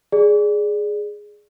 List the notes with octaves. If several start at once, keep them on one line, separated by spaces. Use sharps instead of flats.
G#4 D5